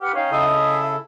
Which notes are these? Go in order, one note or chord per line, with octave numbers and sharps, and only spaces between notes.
G4 B4 F#5 F6
C#4 D#4 F5 G5
C#3 E4 A4 D#5
G#4 E5